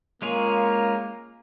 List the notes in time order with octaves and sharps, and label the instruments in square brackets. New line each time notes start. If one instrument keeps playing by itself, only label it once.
[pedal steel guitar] G#3 C#4 F4 G#4 C#5 [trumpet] A#3